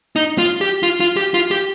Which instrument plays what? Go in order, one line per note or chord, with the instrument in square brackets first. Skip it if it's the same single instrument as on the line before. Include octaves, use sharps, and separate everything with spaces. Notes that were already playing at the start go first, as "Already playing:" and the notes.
[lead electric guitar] D#4
F4
G4
F4
F4
G4
F4
G4